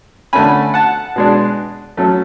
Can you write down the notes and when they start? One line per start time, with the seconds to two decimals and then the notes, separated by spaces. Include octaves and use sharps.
0.33 D3 A3 C#4 G#5 B5
0.74 F#5 A5
1.16 B2 G#3 D4
1.97 F#3 A3 C#4